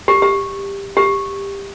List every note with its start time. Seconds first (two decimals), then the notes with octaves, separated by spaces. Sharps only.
0.08 G4
0.22 G4
0.97 G4